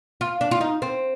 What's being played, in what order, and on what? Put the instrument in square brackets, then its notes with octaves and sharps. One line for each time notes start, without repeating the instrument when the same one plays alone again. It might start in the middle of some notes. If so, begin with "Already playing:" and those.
[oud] F4
D4
F4
D#4
C4